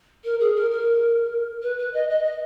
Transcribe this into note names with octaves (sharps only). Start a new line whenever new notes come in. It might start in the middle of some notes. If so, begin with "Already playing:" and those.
A#4
G#4
A#4
A#4
B4
B4
D#5
D#5
D#5